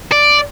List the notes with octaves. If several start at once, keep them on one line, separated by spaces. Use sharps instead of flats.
D5